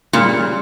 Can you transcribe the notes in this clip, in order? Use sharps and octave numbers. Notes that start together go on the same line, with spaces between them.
A#2 C#3 G3